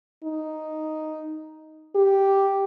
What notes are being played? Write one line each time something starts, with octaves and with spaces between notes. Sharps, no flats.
D#4
G4